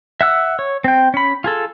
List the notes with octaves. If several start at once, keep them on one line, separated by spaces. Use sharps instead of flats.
E5 F#5 E6
C#5
C4 G5
C#4 B5
F4 G#4 A4